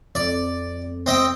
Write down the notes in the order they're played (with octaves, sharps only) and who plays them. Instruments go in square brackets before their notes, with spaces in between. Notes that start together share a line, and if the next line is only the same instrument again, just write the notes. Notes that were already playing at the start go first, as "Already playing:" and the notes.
[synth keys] F2 [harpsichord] D5
[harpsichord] C4 D#5 G5